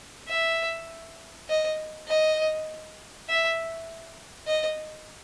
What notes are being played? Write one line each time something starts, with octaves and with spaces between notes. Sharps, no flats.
E5
D#5
D#5
E5
D#5